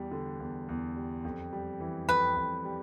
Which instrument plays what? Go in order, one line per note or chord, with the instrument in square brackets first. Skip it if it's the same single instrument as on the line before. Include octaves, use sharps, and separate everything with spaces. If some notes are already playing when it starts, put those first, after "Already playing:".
Already playing: [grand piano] E2 G3
D3
E2
E2
G3
F2
G3
E3
[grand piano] F2 [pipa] B4
[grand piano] F2
G3